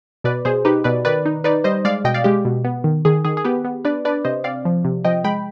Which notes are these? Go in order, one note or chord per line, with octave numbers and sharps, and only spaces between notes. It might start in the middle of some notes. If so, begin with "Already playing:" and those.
B2 B4 D5
B2 G#4 C5
D#4 G4 B4
B2 B4 D5
D#3 B4 D5
D#4
D#4 B4 D5
G3 C5 D#5
G#3 D5 F5
B2 D#5 G5
D5 F5
G#3 G4
B2
B3
D#3
D#3 G#4
D#3 G#4
G#4
B3 G4 B4
B3
D4 B4 D5
D4 B4 D5
C3 C5 D#5
C4 D5 F5
F3
C3
F3 D#5 G5
G#3 G5 B5